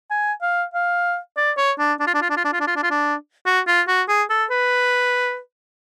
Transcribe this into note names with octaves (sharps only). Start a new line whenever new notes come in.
G#5
F5
F5
D5
C#5
D4
D4
F4
D4
F4
D4
F4
D4
F4
D4
F4
D4
F4
D4
F#4
F4
F#4
G#4
A4
B4